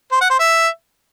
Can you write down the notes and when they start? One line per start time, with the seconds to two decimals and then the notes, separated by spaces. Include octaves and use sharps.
0.12 C5
0.21 F#5
0.30 C5
0.40 E5